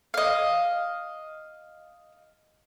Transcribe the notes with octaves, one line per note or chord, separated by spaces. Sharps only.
D#5 F5